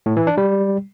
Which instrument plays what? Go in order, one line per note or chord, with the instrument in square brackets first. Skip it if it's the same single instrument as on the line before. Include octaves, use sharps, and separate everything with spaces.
[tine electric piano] A2
E3
D4
G3